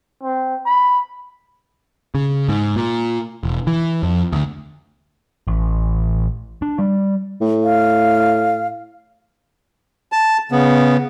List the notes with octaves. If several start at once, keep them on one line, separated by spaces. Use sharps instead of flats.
C4
B5
C#3
G#2
A#2
E1
E3
F2
D2
A1
D4
G3
A2
F5
A5
C#3 B3